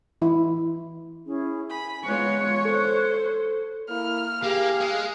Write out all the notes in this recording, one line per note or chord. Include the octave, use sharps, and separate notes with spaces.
E3 E4
C#4 E4 G#4
G#5 B5
G#3 B3 F4 C#5 F#6
A4 C5
A#3 E4 F6
A#3 G4 G#4 F5
G#3